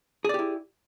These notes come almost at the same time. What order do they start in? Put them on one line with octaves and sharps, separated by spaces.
G#4 D5 G4 E4